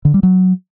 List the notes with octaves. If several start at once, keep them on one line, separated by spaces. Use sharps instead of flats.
D3
G3
F#3